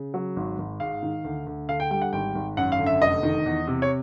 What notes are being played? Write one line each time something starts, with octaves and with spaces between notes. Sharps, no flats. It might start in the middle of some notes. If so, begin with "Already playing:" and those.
Already playing: C#3
F#3
G#1
G#1
G#2 F5
D#3
D2
D2
D3 F5
G5
G3 G5
F#5
G#1 G5
G#1
F#2 F#5
F5
D3
E5
F1 D#5
D#3
E2
C3
C#5